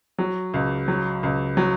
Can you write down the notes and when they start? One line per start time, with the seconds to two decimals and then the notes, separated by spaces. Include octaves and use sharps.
0.18 F#3
0.54 C#2
0.88 F#3
1.23 C#2
1.57 F#3